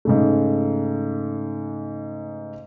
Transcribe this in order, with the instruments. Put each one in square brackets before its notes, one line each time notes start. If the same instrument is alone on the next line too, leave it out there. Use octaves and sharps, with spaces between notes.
[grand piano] G#2 C#3 A3